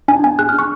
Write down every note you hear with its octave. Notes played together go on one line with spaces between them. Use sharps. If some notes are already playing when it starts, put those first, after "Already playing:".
D4 G#5
B3 G#5
G#4 F#6
F6
D4 C#6